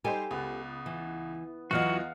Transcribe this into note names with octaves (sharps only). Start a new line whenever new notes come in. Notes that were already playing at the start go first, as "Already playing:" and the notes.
G3 D#4 G4 A4 C5 G#5
C#2 B3
E3
E2 E3 F#3 F4 F#4 D#5 F5 F#5